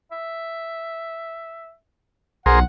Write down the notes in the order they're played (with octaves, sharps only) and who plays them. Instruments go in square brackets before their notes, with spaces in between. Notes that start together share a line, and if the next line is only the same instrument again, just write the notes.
[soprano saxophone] E5
[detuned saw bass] B1 [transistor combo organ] G#4 A#4 C5 [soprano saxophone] F#5